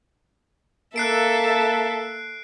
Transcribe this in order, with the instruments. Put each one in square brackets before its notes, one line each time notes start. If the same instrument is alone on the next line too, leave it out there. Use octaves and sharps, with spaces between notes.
[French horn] A#3 [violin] A4 E5 [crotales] F#6 C7 D7